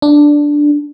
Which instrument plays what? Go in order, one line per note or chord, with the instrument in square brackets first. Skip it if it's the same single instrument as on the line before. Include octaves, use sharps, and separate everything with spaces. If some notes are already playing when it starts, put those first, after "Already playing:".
[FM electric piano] D4